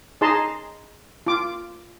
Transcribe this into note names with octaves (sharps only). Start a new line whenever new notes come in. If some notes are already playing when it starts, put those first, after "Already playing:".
D#4 G#4 D#5 A5 A#5 C6
F4 D6